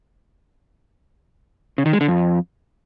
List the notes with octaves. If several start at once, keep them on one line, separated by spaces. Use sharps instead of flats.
C#3
D#3
G#3
D3
F2